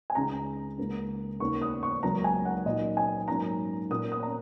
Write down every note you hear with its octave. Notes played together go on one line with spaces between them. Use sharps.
G#5
C#2 C#3 G#3 A#5
C#2 C#3 A#3 C#4
D#2 C#3 A#3 C#6
D#6
C#6
C#2 C#3 F#3 A#3 A#5
G#5
F#5
A#2 F#3 D#4 D#5
G#5
G#2 F#3 A#3 C#4 A#5
A#2 A#3 C#4 D#6
D#6
A#5